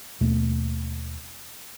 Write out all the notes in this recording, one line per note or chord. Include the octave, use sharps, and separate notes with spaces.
D#2 B2 A3